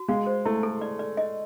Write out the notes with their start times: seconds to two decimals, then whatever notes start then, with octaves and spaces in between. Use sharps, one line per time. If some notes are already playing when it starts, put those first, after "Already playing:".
Already playing: F#4
0.08 G#3 F5
0.26 C5
0.45 A3 E4
0.63 A4
0.81 D5
0.99 D5
1.17 D#5